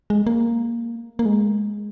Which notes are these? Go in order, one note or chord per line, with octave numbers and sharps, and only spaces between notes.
G#3
A#3
A#3
G#3